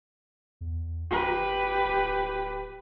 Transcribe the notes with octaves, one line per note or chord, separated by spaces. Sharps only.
E2
F#1 G4 B4
D1